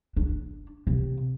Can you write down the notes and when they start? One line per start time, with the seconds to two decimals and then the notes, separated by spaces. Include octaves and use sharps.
0.17 D4
0.87 C3